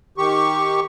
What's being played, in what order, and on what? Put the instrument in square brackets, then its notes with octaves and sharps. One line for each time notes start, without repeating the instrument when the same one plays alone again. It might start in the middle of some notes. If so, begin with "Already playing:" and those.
[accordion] D#3 G4 C#6